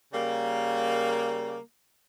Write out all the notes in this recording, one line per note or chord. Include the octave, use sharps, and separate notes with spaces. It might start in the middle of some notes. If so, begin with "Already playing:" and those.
C#3 G3 A#3